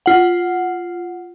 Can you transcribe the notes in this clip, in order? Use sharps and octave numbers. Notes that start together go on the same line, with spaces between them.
F4 F#5